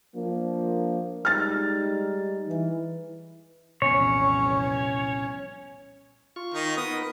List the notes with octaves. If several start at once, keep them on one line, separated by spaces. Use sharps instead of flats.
F3 A#3 D4
G3 G#3 D#4 F6 A6
E3
C2 F2 A#2 E3 B3 C#4 C#5
F4 C#6
D#3 D#4
B3 A#4 B4 D#6